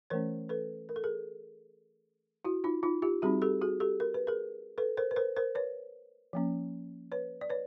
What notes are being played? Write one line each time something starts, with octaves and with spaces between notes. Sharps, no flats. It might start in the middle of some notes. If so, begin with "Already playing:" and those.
E3 A3 C#4 A#4 C5
A4 B4
A#4
A4
G#4 A#4
E4 F#4
D#4 F4
D#4 F4
F4 G4
G3 C4 D#4 F#4 G#4
G4 A4
F#4 G#4
G4 A4
A#4
B4
G#4 A#4
A4 B4
A#4 C5
B4
A#4 C5
A#4 C5
B4 C#5
F3 A#3 C#4
B4 C#5
D5
B4 C#5